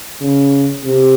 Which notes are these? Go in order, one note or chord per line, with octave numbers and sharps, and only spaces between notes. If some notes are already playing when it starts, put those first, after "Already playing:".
C#3
C3